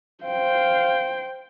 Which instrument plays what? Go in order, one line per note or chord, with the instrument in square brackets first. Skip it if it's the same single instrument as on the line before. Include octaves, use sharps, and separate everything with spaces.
[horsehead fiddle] C5 G5 [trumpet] F5